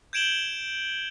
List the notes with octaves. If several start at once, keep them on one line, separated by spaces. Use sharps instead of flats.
G6 G#6 D7 E7 F#7 G7